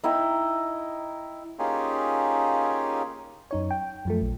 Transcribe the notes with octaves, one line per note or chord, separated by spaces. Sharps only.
D#4 E4 D#5 G5
A#3 C#4 D#4 F4 G4 G#4
F#2 D#4 C#5
G5
F#2 F3 A3
A#1